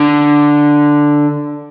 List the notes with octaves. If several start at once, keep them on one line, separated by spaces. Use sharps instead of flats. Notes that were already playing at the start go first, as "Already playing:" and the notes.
Already playing: D3